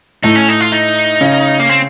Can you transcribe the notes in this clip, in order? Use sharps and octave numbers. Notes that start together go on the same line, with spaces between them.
A2 A3 D#4
C#4
D#4
F4
D#4
C#3 C#4
A#3
C4